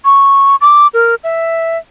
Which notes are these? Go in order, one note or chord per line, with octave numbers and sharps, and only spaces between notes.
C#6
D6
A#4
E5